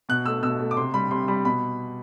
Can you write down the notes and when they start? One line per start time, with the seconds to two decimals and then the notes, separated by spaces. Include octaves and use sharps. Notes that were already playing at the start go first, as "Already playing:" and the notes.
0.09 B2 F#6
0.26 A3 E6
0.43 B2 E6
0.59 A3
0.71 D6
0.76 C3 C6
0.94 G3 B5
1.11 C3 C6
1.28 G3 B5
1.44 B2 B5